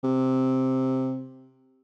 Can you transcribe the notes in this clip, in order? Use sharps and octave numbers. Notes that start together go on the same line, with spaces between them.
C3